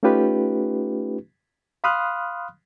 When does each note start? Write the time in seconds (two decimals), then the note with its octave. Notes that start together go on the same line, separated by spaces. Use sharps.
0.03 A3 C#4 D#4 F4 G4 B4
1.84 F5 B5 C6 D#6 F6 F#6